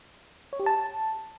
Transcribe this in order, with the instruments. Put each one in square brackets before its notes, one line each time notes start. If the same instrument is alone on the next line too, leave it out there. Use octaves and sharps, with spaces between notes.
[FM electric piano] C#5
G4
A5